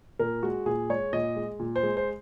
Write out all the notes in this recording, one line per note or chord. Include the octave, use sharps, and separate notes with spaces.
A#2 A#4
G#3 F#4
A#2 G#4
G#3 C#5
A#2 D#5
G#3
A#2
C5
G#3
C5